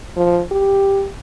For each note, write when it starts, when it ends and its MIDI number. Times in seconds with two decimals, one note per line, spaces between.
0.16 0.41 53
0.52 1.07 67